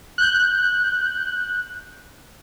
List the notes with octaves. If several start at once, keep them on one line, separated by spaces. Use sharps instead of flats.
F#6 G6